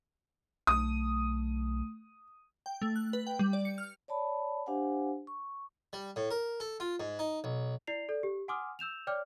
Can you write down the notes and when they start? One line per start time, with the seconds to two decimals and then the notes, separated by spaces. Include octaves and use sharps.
0.67 B1 A3 D#6
2.66 G5
2.82 A3
2.96 F#6
3.13 B4
3.27 G5
3.39 G3
3.53 D5
3.65 C#7
3.78 F6
4.08 C#5 D5 A5 B5
4.66 D4 G4 C5 F5 F#5 G#5
5.27 C#6
5.93 G3
6.16 A2
6.31 A#4
6.60 A4
6.80 F4
7.00 G#2
7.19 D#4
7.44 B1
7.87 E4 D5 C7 F7
8.09 A4 D5
8.23 G4
8.48 F#5 G#5 C6 D6 D#6 F6
8.79 E6 G6 E7 F7
9.07 C#5 D5 G5 D6 F6